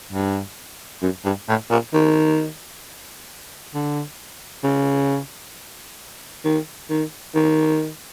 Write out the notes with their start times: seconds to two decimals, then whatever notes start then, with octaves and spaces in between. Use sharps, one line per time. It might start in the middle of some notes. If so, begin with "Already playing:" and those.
0.13 G2
1.02 F#2
1.25 G2
1.49 A2
1.70 A#2
1.93 D#3
3.75 D3
4.64 C#3
6.45 D#3
6.90 D#3
7.35 D#3